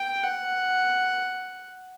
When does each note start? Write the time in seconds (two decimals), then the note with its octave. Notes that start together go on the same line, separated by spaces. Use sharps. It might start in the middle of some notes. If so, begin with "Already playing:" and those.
Already playing: G5
0.23 F#5